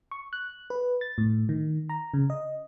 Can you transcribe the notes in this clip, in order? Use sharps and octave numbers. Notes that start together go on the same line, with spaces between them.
C#6
F#6
B4
A6
A2
D#3
A#5
C#3
D#5